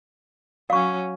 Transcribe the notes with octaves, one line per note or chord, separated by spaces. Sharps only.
F#3 C#4 F5 C#6